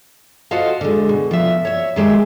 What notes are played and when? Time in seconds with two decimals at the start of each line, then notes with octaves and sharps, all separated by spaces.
0.51 F4 F#4 A4 C5 D#5 F5
0.81 D3 G#3
1.09 B2
1.31 F3 E5
1.65 C#5 E5
1.96 D#3 G#3 G4 E5